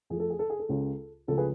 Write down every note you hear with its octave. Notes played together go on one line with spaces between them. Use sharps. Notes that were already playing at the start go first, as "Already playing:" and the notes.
F2 F3 A3 G#4
A4
G#4
A4
G#4
A4
C#2 C#3 G#3
C#2 C#3 F3 A3 A4
G#4 B4